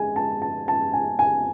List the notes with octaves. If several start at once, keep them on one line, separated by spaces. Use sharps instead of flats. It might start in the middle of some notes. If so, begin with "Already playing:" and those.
Already playing: G#3 G#5
A5
A5
A5
G#5
G#5